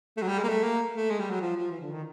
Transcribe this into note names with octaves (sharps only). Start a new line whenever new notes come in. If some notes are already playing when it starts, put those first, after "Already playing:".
A3
F#3
G3
G#3
A#3
A3
A#3
A3
G#3
G3
F#3
F3
F3
E3
D3
D#3